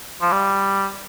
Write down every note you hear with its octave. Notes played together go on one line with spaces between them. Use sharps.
F3
G3